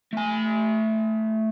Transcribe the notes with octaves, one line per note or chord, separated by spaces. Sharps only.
A3 G#5